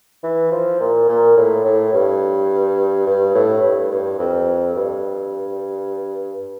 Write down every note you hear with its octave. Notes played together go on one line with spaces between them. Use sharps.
E3
F3
A#2
A#2
A2
A2
G2
G2
A2
G2
G2
F2
G2